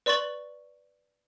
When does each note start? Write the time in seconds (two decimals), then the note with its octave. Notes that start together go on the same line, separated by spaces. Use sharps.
0.06 B4 D5 C6 C#6 A6 F#7